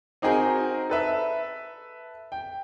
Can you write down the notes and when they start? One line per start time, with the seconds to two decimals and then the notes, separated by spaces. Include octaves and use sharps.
0.22 C4 D#4 F#4 G#4 A#4
0.90 A4 B4 E5
2.32 G5